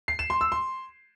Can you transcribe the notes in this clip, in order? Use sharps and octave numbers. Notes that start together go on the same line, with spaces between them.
C7
E7
C6
E6
C6